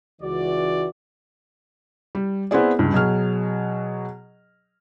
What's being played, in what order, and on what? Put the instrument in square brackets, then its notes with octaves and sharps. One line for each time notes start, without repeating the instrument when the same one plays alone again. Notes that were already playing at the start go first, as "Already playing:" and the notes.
[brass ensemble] C#2 E3 F#4 D5
[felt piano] G3
B3 C4 E4 G#4 D5
C#2 G2
B2 F#3 G#4 F6